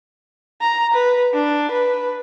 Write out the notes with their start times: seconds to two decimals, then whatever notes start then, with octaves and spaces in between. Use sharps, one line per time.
0.62 A#5
0.94 B4
1.34 D4
1.72 B4